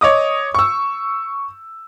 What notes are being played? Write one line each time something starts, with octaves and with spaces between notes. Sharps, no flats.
C#5 D#5 D6 D#6
C#6 E6